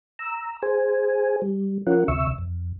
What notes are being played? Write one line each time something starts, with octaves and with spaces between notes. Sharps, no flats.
A#5 E6
G#4 C5 G#5
G3
F3 C#4 F4 A#4 F#5
D2 C3 E5 C#6 E6
F2